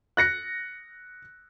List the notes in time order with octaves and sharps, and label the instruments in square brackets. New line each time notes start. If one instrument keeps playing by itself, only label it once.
[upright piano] F#6 A#6 C#7